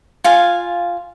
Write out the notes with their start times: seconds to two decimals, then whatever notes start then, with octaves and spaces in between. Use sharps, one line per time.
0.24 F4 F5 G#5